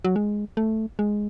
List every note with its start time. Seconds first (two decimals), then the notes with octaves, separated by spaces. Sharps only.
0.05 F#3
0.16 G#3
0.57 A3
0.99 G#3